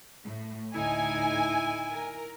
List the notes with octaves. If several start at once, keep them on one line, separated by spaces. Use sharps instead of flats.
A2
D2 A2 D#4 E4 G#5
A#4